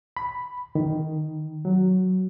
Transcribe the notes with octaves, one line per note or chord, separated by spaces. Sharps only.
B5
D#3
F#3